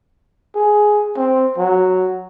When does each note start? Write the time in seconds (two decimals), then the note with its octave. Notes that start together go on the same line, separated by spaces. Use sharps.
0.55 G#4
1.17 C4
1.58 F#3